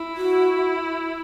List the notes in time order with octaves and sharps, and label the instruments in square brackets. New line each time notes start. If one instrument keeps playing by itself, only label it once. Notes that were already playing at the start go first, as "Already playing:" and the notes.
Already playing: [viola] E4
[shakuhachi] F#4